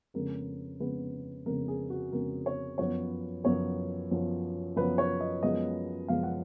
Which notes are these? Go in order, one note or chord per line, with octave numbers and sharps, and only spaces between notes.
F2 C#3 G#3 B3 A#4
F2 C#3 G#3 B3 B4
F2 C#3 G#3 B3 A#4
G#4
F#4
F2 C#3 G#3 B3 A#4
C#5
F#2 F3 B3 C#5
F#2 F3 B3 C#5
F#2 F3 B3
F#2 F3 B3 B4
C#5
D#5
F#2 F3 G#3 B3 D#5
F#2 F3 G#3 B3 F5
F#5